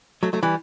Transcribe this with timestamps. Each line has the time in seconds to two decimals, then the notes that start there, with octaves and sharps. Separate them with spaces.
0.23 F#3 A3
0.33 F#3 A3
0.43 E3 G3